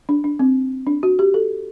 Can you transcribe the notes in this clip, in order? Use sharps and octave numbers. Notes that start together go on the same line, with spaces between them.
D4
D4
C4
D4
F#4
G4
A4